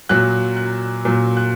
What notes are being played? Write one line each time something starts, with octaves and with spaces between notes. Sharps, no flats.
A#2 F#3 F#6
F#6
A#2 F#3
F#6